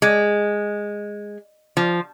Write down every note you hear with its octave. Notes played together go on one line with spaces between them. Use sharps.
G#3
F3